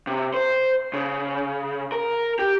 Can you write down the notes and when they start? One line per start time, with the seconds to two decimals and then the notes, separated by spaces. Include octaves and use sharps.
0.07 C3
0.34 C5
0.93 C#3
1.92 A#4
2.39 G4